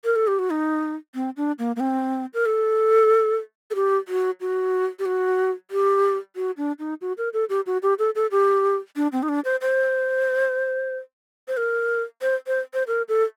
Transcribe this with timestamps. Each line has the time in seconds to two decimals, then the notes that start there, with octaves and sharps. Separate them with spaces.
0.04 A#4
0.16 A4
0.27 G4
0.39 F#4
0.50 D#4
1.15 C4
1.37 D4
1.59 A#3
1.76 A#3
1.80 C4
2.34 A#4
2.46 A4
3.70 A4
3.75 G4
4.08 F#4
4.41 F#4
4.99 G4
5.06 F#4
5.71 G4
6.36 F#4
6.57 D4
6.79 D#4
7.01 F#4
7.18 A#4
7.33 A4
7.49 G4
7.66 F#4
7.83 G4
7.99 A4
8.15 A4
8.31 G4
8.96 D4
9.12 C4
9.23 D#4
9.29 D4
9.45 C5
9.61 C5
11.48 C5
11.57 A#4
12.22 C5
12.47 C5
12.74 C5
12.87 A#4
13.08 A4